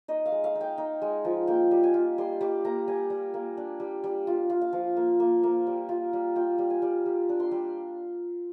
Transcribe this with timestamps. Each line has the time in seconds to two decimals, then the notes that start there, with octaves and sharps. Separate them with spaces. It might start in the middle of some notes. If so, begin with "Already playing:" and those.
0.08 D#4 D#5
0.26 F5
0.32 G#3
0.44 F5
0.55 D#4
0.61 G5
0.78 D#4
1.02 G#3
1.25 F3
1.47 A#3 G5
1.71 G3
1.83 G#5
1.94 F4
2.18 G3 C6
2.41 G3 D6
2.65 A#3 A#5
2.88 G3 G#5
3.10 G3
3.34 A#3
3.57 D4
3.80 G3
4.04 G3
4.27 F4
4.50 F4
4.61 F5
4.73 F3
4.97 A#3
5.20 A#3
5.43 A#3
5.67 G3
5.89 F4
6.13 G3
6.36 F4 G5
6.58 G3
6.70 G#5
6.82 G3
7.06 G3
7.29 D4
7.40 C6
7.51 G3